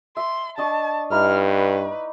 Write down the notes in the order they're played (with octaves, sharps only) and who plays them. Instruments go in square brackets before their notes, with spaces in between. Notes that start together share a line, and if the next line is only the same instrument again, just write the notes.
[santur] E5 [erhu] C6
[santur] D4 D#5 C#6 [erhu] A5
[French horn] G2 [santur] A#3 D#4 E4 [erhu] F6
[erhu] B4